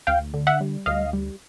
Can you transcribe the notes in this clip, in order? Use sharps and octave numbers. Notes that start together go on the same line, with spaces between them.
D2 F5 G5
D3
E5 F#5
G3
D2 D#5 F5
G3